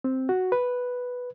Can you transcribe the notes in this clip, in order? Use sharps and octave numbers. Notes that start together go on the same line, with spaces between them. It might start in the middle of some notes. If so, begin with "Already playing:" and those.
C4
F#4
B4